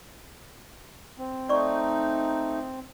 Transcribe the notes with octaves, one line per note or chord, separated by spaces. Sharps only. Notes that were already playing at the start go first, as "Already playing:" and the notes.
C4
A3 D#4 D5 C#6